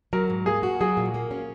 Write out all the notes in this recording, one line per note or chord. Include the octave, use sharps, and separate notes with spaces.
F#3 A#4
G#2
A#3 G#4
F#4
F#3 G#4
A#2
A#3
C#4